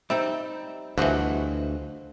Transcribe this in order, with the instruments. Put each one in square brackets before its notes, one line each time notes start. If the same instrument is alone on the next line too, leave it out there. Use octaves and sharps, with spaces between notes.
[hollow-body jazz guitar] G3 C4 D#4 [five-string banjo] E5
[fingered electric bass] D2 [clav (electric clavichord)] G2 E3 [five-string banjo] F3 F#4 [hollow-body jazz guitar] B4 C5 D#5